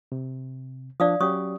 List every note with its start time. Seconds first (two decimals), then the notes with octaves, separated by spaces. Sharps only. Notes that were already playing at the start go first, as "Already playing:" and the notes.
0.12 C3
1.00 F3 D4 D5 F5 D#6
1.20 F#3 C#4 G4 C#5 C#6 D#6